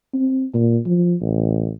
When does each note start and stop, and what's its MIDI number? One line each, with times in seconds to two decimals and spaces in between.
0.14 0.45 60
0.54 0.79 46
0.86 1.14 53
1.21 1.70 33